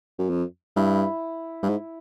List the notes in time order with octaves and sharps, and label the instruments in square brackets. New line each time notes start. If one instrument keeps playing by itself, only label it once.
[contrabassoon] F#2
F2
[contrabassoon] G2 [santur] E4
[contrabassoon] G2
G#2